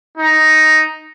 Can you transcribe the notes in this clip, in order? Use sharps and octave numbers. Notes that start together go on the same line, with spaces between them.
D#4